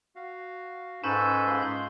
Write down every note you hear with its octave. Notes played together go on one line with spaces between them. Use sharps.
F#4 F5
G#2 C#4 A4 B4 G#5 B5 E6 G6
G#3 F4 C6